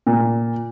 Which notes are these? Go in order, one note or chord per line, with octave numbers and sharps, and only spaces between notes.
A#2